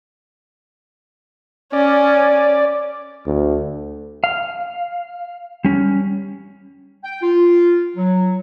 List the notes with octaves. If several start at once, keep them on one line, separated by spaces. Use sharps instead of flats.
C#4 D5
D2
F5
G3 C#4
G5
F4
F#3